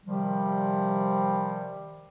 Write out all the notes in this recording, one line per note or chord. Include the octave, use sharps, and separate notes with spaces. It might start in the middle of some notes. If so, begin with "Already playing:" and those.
C3 D#3 F3 G3